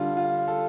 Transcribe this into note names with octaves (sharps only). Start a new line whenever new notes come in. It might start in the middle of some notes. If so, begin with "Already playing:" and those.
Already playing: D3 G3 F4
F4
A4